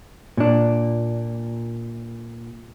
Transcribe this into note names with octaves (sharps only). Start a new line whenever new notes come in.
A#2 D4